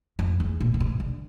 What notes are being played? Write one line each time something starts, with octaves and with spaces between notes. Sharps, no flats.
F2
E2
A#2
D3
C3
D3